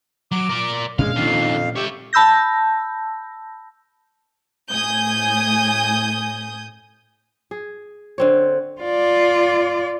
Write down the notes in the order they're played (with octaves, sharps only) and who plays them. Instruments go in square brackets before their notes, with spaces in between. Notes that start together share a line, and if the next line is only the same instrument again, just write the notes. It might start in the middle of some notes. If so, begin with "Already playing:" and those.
[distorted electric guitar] F#3 [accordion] D6
[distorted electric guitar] A#4 D5
[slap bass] A#2 C#4 D4 [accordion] G#3 [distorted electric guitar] F5
[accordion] F2 F5 [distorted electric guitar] D3 D#3
[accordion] G4 [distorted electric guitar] C#5 E5
[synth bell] A5 B5 E6 G6 A#6
[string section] A2 G#5 D#6 G6
[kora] G#4
D3 C4 C#5
[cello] F4 D5